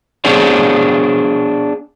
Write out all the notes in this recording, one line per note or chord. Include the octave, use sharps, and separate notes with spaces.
B3 D4 G#4 C5 C#5